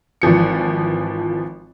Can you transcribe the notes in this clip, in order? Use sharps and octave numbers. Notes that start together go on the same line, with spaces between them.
G#1 E3 F3 C#7